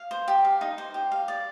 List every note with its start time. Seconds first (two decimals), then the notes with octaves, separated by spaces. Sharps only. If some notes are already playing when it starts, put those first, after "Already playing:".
Already playing: F5
0.11 C5
0.28 G4
0.45 F5
0.61 D#4
0.78 C5
0.94 G4
1.12 F5
1.28 D5